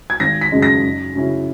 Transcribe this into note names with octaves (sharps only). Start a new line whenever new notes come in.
G#6
G#1 A#6
B6
F#2 C#3 G#3 D#4
A#6
F#2
C#3 F#3 C#4 E4